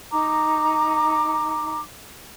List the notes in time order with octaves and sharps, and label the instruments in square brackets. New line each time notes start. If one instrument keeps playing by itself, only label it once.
[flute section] D#4 A#5 D6